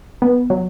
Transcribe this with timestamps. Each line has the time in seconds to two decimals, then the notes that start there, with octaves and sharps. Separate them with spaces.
0.22 B3
0.50 F#3